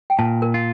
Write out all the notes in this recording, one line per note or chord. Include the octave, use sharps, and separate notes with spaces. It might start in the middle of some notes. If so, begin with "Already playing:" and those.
G5
A#2 A5
A#4
F4